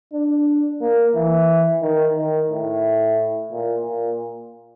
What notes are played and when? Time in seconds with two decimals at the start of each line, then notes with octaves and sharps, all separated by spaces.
0.13 D4
0.81 A#3
1.14 E3
1.82 D#3
2.16 D#3
2.50 A2
3.52 A#2
3.86 A#2